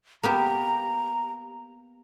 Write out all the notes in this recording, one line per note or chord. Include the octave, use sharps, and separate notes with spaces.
A#3 B3 G4 A#5